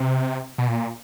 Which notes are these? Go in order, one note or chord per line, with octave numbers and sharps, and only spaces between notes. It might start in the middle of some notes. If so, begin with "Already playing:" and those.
Already playing: C3
B2
A#2